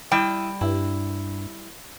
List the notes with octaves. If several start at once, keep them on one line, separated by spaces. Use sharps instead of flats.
G3 E4 D#5 G5 A5
G2 E4